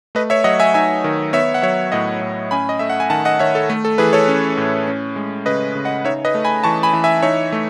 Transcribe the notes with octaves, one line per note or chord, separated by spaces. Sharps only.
A3 B4 D#5
C#5 E5
F#3 D#5 F#5
E5 G#5
D#4 E5 G#5
D#3
B3 C#5 E5
F#5
F#3 C#5 E5
A2 D#5 F#5
A2
C#4 G#5 B5
D#5
A3 E5
F#5
G#5
D#3 F#5 A5
D#5 F#5
D#3 C#5 E5
A4
A3
A4
E3 G#4 B4
A4 C#5
C#4
A2
C#4
G#3
C#3 B4 D#5
C#3
D#5 F#5
D#4 C#5 E5
B4 D#5
A3
G#5 B5
E3 A5 C#6
G#5 B5
E3
E5 G#5
D#4 C#5 E5
A3